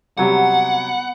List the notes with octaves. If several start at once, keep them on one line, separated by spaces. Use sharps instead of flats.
C3 F#3 G3 B3 F#5